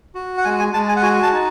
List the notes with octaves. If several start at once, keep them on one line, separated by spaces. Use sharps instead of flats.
F#4
F#5
G#3 G#5
G#5
G#3 A5
G#5
F#5
F#4 G#5
A5
D#4